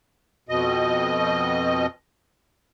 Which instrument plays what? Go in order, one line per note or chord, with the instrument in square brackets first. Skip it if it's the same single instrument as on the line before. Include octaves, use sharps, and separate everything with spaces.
[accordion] F2 B2 D#5